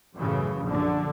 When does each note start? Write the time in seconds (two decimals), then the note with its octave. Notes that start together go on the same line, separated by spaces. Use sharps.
0.17 F#2 A2 C#3 E3
0.64 A#1 F#2 D3